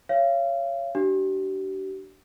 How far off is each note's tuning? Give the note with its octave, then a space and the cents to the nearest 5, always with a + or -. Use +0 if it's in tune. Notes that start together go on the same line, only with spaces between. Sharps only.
C#5 +0 F5 -35
D4 +0 G4 -45